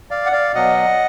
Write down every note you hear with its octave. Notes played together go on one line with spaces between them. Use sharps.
D5 F5
F#5
D5 F5
B2 F#3 D#5 F#5